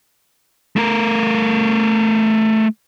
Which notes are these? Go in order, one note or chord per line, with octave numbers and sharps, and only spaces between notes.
A3 A#4